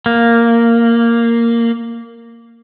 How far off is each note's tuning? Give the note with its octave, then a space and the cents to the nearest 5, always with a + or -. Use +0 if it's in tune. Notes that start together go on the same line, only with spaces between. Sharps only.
A#3 -5